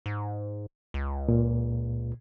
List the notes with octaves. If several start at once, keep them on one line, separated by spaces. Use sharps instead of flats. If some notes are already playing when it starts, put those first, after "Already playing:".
G#2
C#2
A#2